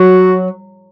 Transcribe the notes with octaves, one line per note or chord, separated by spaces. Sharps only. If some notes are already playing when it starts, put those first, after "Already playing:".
Already playing: F#3 F#4